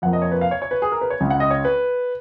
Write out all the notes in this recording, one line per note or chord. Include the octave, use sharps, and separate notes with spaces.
F2 F3 A#3 F#5
D#5
C#5
B4
F5
C#5
C#5
B4
G#4
A#4
B4
C#5
C#2 C#3 G#3
F#5
D#5
C#5
B4